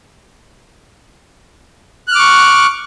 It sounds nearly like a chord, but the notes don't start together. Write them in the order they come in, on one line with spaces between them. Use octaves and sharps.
F#6 F6 D6 C#6